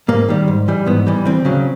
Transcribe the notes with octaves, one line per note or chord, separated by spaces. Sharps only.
G#2 A#3
D#3 G3
G#2
E3 G3
G#2 B3
E3 G3
D2 C4
C#3 F#3